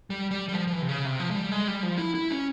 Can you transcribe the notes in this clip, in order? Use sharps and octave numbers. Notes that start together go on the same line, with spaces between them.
G3
G3
G3
F3
F3
E3
C3
C#3
C3
F3
G#3
G3
G#3
G3
F3
E4
E4
C#4